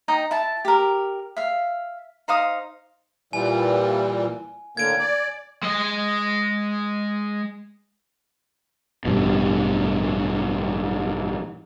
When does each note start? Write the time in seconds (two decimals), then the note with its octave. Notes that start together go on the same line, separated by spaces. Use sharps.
0.08 D#4 D#5 G5
0.31 E4 A5
0.65 G4 A#4
1.37 E5 F5
2.28 D#4 C5 F5 D#6
3.33 A#2 E3 G3 G#5
4.77 A2 D3 A#3 G#6 D7
4.99 D5
5.63 G#3 D#5
9.05 A1 G2 B2